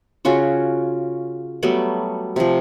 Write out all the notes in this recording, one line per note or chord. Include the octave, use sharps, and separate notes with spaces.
C#3 C#4 F4 F#4
F#3 G3 A3 B3
C3 F3